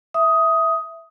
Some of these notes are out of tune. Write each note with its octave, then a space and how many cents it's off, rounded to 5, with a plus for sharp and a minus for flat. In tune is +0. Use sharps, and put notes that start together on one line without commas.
E5 +0 D#6 +10